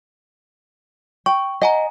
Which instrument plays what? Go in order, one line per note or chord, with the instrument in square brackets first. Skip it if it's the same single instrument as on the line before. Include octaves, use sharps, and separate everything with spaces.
[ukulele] G5 [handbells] C#6
[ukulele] D#5 [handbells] F#5 G#5 A#5